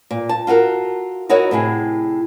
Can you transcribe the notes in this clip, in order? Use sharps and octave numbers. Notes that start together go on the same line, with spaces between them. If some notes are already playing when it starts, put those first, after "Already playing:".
A#2
A5
F4 F#4 A4 A#4
D#4 E4 F#4 A#4 C#5 D#5
A2 C3 E4 G#4